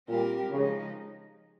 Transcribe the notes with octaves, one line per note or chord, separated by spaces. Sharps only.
A#2 G3 C4 G4 A#4
C#3 F3 G#3 D#4